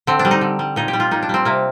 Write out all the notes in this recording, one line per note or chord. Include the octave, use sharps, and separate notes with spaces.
D3 C4
D4
G3
D#4
D3
G3
A#2 D#4
G4
G3
F4
A#2 D#4
D4
G3 C4
C3 A#3